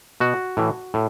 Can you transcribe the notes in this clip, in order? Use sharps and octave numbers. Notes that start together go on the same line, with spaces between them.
B2 F#4
A2 E3
A2